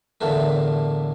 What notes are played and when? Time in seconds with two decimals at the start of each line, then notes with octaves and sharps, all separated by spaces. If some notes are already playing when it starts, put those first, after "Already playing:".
0.21 E2 A2 D3 E3 A#3